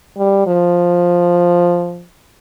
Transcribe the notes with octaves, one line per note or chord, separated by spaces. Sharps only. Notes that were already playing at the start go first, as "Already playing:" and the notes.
G3
F3